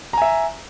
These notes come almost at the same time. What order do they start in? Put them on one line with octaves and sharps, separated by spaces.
A#5 G#5 E5